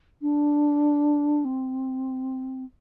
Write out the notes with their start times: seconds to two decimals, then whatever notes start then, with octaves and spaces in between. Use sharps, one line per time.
0.21 D4
1.44 C4